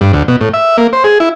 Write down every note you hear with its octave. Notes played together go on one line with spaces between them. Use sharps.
G2
D2
B2
A2
E5
A#3
C5
G#4
E4